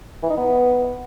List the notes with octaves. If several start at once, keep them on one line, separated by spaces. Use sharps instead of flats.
E3
D#4
B3